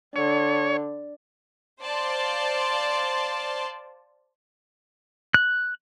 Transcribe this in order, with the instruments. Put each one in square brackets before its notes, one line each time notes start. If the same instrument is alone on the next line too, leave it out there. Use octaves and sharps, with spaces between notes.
[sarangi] D3 [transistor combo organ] C#5
[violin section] C5 D5 F5 A5 C6
[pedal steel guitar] F#6